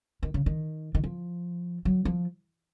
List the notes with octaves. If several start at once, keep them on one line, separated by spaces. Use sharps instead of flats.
D#3
C#3
D#3
D#3
F3
F#3
F3